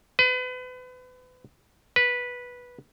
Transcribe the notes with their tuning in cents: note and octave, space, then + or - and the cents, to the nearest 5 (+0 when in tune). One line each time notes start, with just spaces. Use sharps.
B4 +35
B4 -10